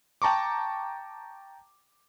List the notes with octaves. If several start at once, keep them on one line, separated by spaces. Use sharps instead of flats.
G5 A5 A#5 C#6 D6